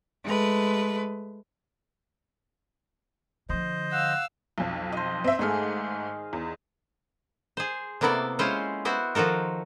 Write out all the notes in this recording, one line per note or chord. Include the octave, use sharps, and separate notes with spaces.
G#3 A3 B4
D3 F3 C5 D#5
F5 F#5 E6
B1 F2
C5 D#5
C4 D#5 E5
G#2 D#3 A3 G#4 F5
E2
G#4 C5
C3 A#3 B3 E4 A4 D5
G#3 C#4 E4 F4 C5
B3 E4 F#4 C5
D#3 F3 F#4 A4 A#4